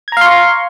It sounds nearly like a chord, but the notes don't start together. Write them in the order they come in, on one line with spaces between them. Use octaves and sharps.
G#6 A#5 F5 C6 C#6